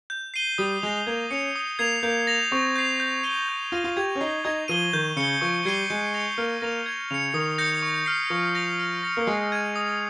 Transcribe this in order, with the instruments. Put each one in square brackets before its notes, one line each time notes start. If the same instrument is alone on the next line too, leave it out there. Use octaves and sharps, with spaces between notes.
[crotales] G6
C7 D#7 G7
[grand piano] G3 [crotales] D#6
[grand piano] G#3 [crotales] A#6 F7
[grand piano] A#3 [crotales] G#6
[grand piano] C#4 [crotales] C#7 F7
[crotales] D#6
[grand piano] A#3 [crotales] G#6 C7 F7
[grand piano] A#3 [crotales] G6
[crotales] A#6 F7
[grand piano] C4 [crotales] C#6
[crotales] G6 C7 F7
G6
C7 D#7 G7
G6
[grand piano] F4 [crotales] A#6 D#7 G7
[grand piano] F4
[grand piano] G4 [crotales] G#6
[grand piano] C#4
[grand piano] D#4 [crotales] C7 G7
[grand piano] D#4 [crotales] G#6
[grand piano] F3 [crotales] D#7 G7
[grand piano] D#3 [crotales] G6
[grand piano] C#3 [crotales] C#7 G7
[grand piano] F3 [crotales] C#6
[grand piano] G3 [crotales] G#6 C7 D#7 G7
[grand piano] G#3 [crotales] G6
[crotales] A#6 C#7 F7
[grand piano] A#3 [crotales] F6
[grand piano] A#3 [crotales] A#6 F7
[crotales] G#6
[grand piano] C#3 [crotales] C#7 F7
[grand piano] D#3 [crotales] D#6
[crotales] G6 A#6 C#7
C#6
F6 C7
[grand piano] F3 [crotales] C#6
[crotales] G6 A#6 F7
F6
A#6 C#7 F7
[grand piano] A#3
[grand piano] G#3 [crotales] C#6
[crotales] G#6 D#7
D#6